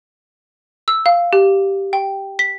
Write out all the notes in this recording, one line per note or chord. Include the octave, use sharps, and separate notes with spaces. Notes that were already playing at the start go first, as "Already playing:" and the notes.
E6
F5
G4
G5
B6